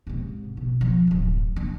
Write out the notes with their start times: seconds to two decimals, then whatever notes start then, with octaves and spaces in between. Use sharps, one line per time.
0.07 G#2 C3
0.57 B2
0.81 F3
1.07 D1 F#2
1.56 D4